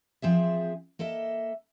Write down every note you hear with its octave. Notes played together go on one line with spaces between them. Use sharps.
F3 C4 G#4 E5
A#3 A4 D#5 E5